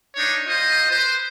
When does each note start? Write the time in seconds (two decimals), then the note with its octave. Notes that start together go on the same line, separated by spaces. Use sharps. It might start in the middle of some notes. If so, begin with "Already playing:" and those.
0.16 D4 D#4 C#5
0.47 F4 C5 D#5
0.90 B4 C5